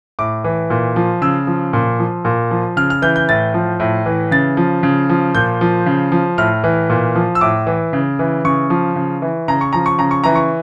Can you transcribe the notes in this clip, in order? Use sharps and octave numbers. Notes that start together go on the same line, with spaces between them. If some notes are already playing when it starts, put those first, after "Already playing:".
A2 D6
E3
A#2
F3
C#3 E6
F3
A#2
F3
A#2
F3
C#3 F6
F6
E3 G6
G6
A2 A6
F3
A2
E3
C#3 A6
F3
C#3
F3
A#2 G6
F3
C#3
F3
A2 F6
E3
A#2
F3
E6
A2 D6
E3
C#3
E3
C#3 C#6
F3
C#3
E3
C#3 A#5
C#6
F3 A#5
C#6
C#3 A#5
C#6
E3 A#5
C#6